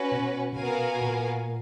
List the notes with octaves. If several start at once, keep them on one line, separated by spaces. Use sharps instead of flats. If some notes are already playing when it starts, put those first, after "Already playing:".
Already playing: C#4 F#4 B4
B2
B2 B3 F#4 A#4 F5 G#5
A#2